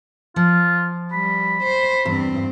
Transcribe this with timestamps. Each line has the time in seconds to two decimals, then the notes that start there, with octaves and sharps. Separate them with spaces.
0.36 F3 F4
1.12 G3 B5
1.64 C5
2.05 E2 G2 C4